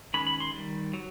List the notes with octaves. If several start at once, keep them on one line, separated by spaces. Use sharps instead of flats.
D#3 G#3 C#4 B5
B5
C6
D#3 G3
F#3